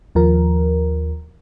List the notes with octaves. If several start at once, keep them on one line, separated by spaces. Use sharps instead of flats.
D#2 F3 A#4